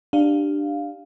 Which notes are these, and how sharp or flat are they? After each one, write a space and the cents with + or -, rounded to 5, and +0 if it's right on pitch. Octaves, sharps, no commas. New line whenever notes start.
D4 +10 G4 +0 F5 +0